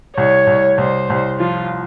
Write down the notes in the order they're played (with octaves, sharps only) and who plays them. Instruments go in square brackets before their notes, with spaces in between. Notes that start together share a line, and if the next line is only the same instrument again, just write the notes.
[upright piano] C2 [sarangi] C#5
[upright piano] C2
[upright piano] C2 [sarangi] C5
[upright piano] C2
[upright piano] F3 [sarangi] F4